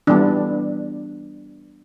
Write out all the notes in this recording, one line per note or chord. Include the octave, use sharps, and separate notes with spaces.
E3 G3 B3 D4